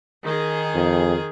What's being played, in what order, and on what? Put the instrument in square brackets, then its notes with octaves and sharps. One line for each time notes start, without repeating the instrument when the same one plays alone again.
[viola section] D#3 G#4
[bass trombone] F2